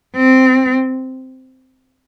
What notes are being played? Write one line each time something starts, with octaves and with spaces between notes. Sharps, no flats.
C4